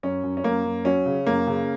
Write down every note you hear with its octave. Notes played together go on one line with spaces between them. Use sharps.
F#2 C#4
F#2
C#4
F#2 A#3
F#2
F#3 C#4
C#3
F#2 A#3
C#3